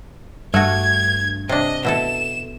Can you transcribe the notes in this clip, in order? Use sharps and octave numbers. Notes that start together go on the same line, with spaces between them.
G2 A3 F#4 G#6
C3 D4 D#5
B2 E4 A4 E7